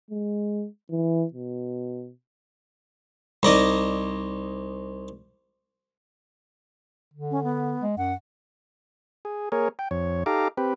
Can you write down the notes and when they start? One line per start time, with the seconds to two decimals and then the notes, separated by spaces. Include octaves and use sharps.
0.11 G#3
0.90 E3
1.34 B2
3.43 C2 D#4 D5 D#5
7.14 D3
7.31 C#4
7.44 B3
7.81 G#3
7.98 F#2 F#5
9.25 G#4
9.52 A#3 G#4 A#4 C#5
9.79 G5
9.91 F2 C#5
10.26 D#4 G4 A4 F5 A#5 D6
10.57 C4 G4 B4